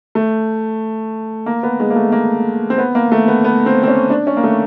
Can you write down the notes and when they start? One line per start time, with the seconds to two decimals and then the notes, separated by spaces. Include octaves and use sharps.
0.15 A3
1.46 A#3
1.63 B3
1.80 G#3
1.90 A#3
1.96 A3
2.12 A#3
2.70 C4
2.78 B3
2.95 A#3
3.12 A3
3.28 B3
3.44 B3
3.66 C4
3.83 C4
3.88 C#4
4.10 D4
4.27 C#4
4.37 A#3
4.44 A3